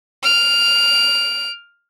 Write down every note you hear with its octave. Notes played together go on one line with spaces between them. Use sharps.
F6 D7